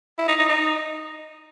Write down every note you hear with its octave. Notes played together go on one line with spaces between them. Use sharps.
E4
D#4
D#4
D#4